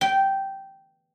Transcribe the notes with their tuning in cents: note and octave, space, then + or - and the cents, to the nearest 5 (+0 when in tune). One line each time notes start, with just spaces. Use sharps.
G5 -10